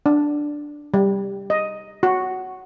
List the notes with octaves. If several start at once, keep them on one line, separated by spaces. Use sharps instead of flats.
D4
G3
D#5
F#4